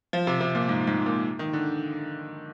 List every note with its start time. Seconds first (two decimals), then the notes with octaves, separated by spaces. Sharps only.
0.13 F3
0.27 C3
0.41 C3
0.55 A#2
0.69 G#2
0.87 G#2
1.06 A#2
1.39 D#3
1.53 D3